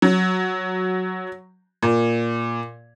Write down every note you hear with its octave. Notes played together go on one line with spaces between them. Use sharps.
F#3
A#2